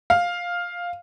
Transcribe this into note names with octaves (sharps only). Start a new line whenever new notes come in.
F5